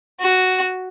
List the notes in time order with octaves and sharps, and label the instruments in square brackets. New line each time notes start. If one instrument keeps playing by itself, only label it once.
[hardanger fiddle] F#4